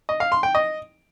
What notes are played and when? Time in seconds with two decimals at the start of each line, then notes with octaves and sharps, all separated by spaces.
0.09 D#5
0.20 F5
0.32 C6
0.43 G5
0.55 D#5